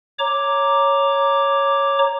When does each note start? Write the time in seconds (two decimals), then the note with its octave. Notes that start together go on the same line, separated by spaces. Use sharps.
0.19 C#5 A#5 D6